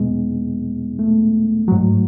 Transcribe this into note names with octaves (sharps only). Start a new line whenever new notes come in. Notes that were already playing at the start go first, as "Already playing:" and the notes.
Already playing: E2 B2 F#3 G#3 B3
A3
G#2 F#3